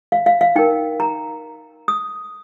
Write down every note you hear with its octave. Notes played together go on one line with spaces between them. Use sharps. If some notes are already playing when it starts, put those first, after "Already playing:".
F5
F5
F5
D#4 A#4 G5
A#5
D#6